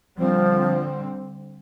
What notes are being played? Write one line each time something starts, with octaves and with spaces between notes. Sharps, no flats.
D3 F3 G3 C4